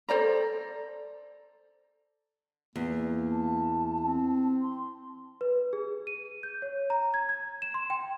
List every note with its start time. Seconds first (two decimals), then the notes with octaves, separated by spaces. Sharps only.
0.09 A4 C5 D5 A#5
2.76 E2 A#3
3.31 A5
4.01 C4
4.61 C6
5.41 B4
5.73 G#4
6.07 D#7
6.43 G6
6.62 C#5
6.90 A#5
7.14 G#6
7.29 G#6
7.62 E7
7.74 C6
7.90 G5